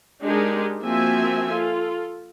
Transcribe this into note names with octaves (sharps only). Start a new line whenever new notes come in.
G#3 D4 D#4 G4 G#4 A#4
F3 A#3 C4 F#4 E5 G#5
F4 A4